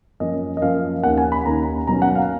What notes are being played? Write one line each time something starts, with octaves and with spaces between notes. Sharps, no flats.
F#2 F3 A#3 C#4 D#5
D#5
F#2 F3 A#3 C#4 F5
D#2 D#3 A#3 C#4 F#5
G#5
B5
D#2 D#3 A#3 C#4 A#5
B2 F#3 A#3 C#4 A#5
F#5
F5